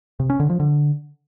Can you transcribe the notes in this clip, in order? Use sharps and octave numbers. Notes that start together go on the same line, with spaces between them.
C3
C#4
D3
F3
D3